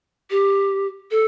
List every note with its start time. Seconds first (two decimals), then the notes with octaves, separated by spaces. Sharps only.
0.31 G4
1.11 A4